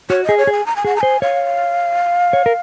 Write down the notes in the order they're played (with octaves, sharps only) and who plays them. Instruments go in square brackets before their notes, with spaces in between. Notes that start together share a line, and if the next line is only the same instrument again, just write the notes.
[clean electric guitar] F#4 [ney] C#5
[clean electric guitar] G#4 [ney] D#5
[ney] C#5
[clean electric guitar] G#4
[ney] G#5
A#5
G#5
[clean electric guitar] G#4 [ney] F#5
[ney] A#5
[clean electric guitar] C5 [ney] G#5
[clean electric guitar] C#5 [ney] F5
[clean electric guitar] C#5
A#4